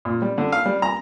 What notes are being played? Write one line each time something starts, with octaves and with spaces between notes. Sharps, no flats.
A#2
G3
D3
F5
G3
A#5